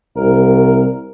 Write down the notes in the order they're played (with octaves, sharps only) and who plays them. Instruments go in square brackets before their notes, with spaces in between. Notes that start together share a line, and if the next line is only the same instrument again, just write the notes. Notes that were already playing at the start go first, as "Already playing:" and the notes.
[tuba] C2 [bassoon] A#4